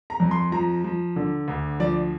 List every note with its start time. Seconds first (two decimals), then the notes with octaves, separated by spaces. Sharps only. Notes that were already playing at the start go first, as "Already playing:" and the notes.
0.10 A#5
0.20 F2
0.31 C6
0.52 F3 A#5
0.84 F3
1.16 D3
1.48 D2
1.80 F3 D5